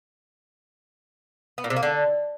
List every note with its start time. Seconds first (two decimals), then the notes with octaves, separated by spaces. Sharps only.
1.58 B3
1.64 A#2
1.70 C3
1.76 A#3
1.83 D3